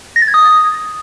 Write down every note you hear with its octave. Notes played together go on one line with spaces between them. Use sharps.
A#6
A6
G#6
D#6